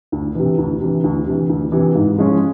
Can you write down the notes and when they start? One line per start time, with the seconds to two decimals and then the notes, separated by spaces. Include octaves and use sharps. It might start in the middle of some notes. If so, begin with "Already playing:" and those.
0.12 D2
0.35 C3 E3
0.58 D2
0.81 C3 E3
1.04 D2
1.26 C3 E3
1.49 D2
1.72 C3 E3
1.95 G#2
2.18 F3 G#3 C#4 F4